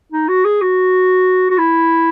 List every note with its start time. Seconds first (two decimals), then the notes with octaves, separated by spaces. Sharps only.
0.12 D#4
0.28 F#4
0.45 G#4
0.62 F#4
1.50 F#4
1.58 E4